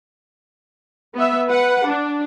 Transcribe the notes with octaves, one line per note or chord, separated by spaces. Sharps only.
B3 E5
B4 F#5
D4